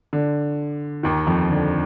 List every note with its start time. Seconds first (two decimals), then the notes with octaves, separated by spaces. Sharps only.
0.13 D3
1.03 D#2 D#3
1.27 F2 F3
1.49 D3